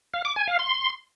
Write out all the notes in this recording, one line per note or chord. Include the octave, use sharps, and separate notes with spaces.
F5
D6
G#5
F5
C6